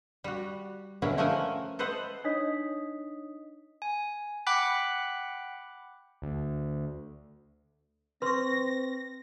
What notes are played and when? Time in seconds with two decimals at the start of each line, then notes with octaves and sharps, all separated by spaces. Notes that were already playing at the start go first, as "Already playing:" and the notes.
0.24 G3 F#4
1.02 B2 D3 F#3 C#4 E4 A#4
1.18 F3 A3 C#4 A#4 F#5 G#5
1.79 A4 B4 C5 D#5 F#5
2.24 D4 D#4 C#5 D#5 D#6 B6
3.82 G#5
4.47 F#5 G5 B5 D6 F#6 B6
6.22 D2
8.22 C4 B4 C6 C#6 A#6